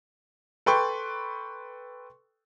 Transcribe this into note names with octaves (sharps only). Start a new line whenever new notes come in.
A4 B4 G5 C6 C#6